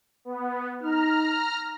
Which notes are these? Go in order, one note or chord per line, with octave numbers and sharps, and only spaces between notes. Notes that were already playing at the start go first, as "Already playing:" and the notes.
B3
D#4 A#5 F6